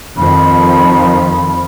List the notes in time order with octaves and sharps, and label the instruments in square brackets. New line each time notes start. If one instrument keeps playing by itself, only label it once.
[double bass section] F2 D#3 F3 [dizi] B5